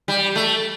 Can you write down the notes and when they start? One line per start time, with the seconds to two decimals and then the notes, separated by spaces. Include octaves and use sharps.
0.08 G3
0.36 A3